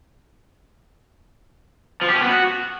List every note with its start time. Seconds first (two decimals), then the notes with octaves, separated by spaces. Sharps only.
2.02 F3
2.08 G4
2.15 C#4
2.22 B3
2.29 F#4